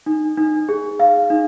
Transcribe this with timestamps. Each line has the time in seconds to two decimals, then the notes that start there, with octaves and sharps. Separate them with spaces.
0.06 D#4
0.38 D#4
0.69 G#4
1.00 F5
1.30 D#4